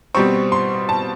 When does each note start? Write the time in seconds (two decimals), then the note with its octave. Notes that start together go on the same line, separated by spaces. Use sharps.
0.15 B2 G3 C4 C#6
0.52 C6
0.89 A5